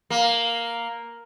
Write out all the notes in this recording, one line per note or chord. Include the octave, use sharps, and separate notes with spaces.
A#3